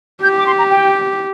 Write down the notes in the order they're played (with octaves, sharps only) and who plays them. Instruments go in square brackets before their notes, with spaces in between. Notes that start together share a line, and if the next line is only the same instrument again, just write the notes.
[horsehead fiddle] G4 [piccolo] G6
[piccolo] D6
C6
A#5
G5